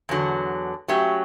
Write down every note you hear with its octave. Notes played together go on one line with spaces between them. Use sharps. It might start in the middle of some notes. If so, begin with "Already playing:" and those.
E2 D3 F#3
F#3 A3 C#4 G4